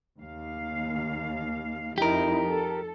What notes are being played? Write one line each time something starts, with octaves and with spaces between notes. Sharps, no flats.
D#2 F5
F2 D#4 E4 G4 A#4
A4